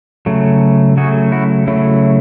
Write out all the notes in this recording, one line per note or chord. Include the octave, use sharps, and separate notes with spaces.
C#3 F#3 A3
C#3 F#3 A3 F#4 G#4
E4 F#4
C#3 F#3 A3 E4